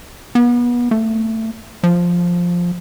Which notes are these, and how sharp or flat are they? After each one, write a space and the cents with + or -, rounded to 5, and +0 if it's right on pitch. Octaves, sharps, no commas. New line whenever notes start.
B3 -30
A3 +20
F3 +5